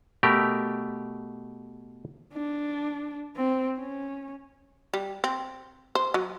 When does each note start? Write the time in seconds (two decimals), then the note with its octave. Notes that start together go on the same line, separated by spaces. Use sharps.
0.23 B2 A3 G4 A#4
2.34 D4
3.36 C4
3.79 C#4
4.94 G3
5.24 C4
5.95 C5
6.14 F#3